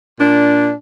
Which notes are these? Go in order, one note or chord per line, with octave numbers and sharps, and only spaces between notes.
A#2 D4